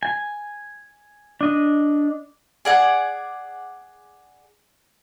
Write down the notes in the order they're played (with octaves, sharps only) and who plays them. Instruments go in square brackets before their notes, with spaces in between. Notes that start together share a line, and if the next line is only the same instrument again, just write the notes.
[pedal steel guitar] G#5
D4 D#5
[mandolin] G#4 D5 F#5